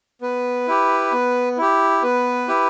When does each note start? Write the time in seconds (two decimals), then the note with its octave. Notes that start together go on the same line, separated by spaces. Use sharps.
0.22 B3 B4
0.68 E4 G4
1.12 B3
1.58 E4 G4
2.03 B3 B4
2.48 E4 G4